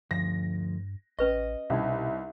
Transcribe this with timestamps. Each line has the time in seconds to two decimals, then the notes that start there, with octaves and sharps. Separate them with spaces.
0.11 D2 G2 F3 A#6
1.19 A1 C#4 B4 D#5 C#6
1.70 C2 B2 C#4 D#4